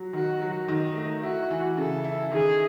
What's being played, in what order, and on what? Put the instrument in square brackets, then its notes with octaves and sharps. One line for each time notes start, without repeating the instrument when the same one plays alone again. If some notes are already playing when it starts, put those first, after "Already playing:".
Already playing: [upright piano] F#3
[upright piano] D#3 [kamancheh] F#4
[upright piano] F#3
[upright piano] D#3 [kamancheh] D#4
[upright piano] A3
[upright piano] E4 [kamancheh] F#4
[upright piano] E3
[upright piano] C#3 [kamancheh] A4
[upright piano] E4
[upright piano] D#3 [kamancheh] G#4